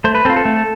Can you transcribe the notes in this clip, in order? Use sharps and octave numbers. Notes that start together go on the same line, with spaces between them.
A3 C5
B4
C4 F4 A4
A4
A3